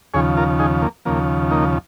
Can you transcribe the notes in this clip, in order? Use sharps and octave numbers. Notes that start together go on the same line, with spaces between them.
D#2 C#3 F3 G#4 C#5
F4 A#4
D#4 G#4
A#3
D#2 C#3 F3 A#3
A#3 D#4